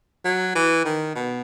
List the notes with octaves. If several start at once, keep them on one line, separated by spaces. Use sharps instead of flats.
F#3
E3
D#3
B2